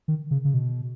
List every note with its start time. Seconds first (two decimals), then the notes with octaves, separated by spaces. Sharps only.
0.08 D#3
0.31 C#3
0.45 C#3
0.54 B2